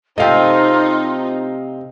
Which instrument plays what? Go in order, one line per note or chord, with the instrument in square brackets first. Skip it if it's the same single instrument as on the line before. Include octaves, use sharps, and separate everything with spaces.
[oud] C3 A3 [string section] D#4 [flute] F4 [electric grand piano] D#5 F5 G5